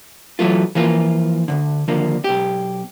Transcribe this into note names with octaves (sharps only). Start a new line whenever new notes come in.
E3 F#3 G#3 A3 F4
E3 F3 A#3 F4
D2 G2 D3
D#2 D3 F3 A#3
B1 G4